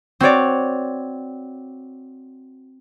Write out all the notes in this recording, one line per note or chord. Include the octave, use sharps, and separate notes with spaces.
C4 F#4 C#5 D5